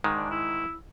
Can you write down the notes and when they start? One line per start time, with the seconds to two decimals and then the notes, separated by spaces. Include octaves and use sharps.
0.04 G#2 D#3 G#3
0.16 D4
0.30 E4